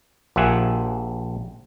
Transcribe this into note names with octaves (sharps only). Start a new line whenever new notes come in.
A#1 F4 G4 E5 F#5 G#5